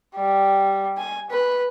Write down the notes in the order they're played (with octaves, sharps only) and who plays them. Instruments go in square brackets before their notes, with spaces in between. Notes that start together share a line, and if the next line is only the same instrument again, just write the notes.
[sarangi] G3
G#5
B4